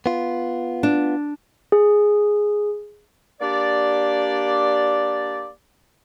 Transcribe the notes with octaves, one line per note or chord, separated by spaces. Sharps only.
B3 F4
D4
G#4
A#3 D4 G4 D5